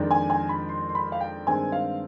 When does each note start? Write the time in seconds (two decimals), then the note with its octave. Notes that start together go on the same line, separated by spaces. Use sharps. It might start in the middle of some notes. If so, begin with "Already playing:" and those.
Already playing: F2 D#3 G#3 D4
0.11 G#5
0.30 G#5
0.49 B5
0.69 C6
0.89 C6
0.95 B5
1.12 F5
1.20 G5
1.46 G2 D#3 G#3 C4 G#5
1.72 F5